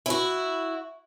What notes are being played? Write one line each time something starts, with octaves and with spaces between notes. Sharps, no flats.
E4 F#4